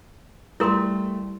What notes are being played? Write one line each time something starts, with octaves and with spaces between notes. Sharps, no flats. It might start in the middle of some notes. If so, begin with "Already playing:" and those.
G3 A3 E4 A#4 C6